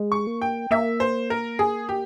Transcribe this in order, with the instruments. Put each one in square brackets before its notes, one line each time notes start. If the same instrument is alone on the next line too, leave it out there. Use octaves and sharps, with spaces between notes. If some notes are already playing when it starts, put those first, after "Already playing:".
Already playing: [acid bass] G#3
[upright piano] C#6
[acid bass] A#3
[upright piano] G5
[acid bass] A#3 [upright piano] E5
[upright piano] C5
A#4
G#4
G4